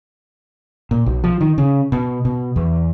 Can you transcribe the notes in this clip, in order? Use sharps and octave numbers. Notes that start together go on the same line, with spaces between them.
A#2
B1
F3
D#3
C#3
B2
B2
E2